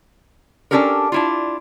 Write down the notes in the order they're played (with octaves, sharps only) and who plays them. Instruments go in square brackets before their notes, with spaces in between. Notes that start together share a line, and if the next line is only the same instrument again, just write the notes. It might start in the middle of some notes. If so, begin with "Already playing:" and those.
[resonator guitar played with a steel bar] C#4 D4 E4 G4 A4 A#4
D4 E4 F4